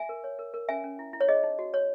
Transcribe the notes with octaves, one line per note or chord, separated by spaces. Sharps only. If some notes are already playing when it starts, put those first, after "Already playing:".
Already playing: E5 G#5
A#4
C#5
A#4
A#4
C#4 E5 G#5
C#4
E4
E4
C#5
G#4 D#5
D#4
F#4
C#5